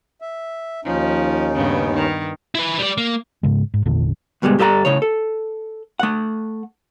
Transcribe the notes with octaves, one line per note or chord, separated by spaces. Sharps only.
E5
D#2 F3 C#4 D#4
G2 C#3 B3
D#3
E4 B4
G3 D5
A#3
G#2 C#3 G#3
G#2
G#1 E2 A#2 D3
D2 G2 B2 G3 G#3
G2 G4 A4 D5 A#5
A2 C#3 C#5
A4
A3 F#5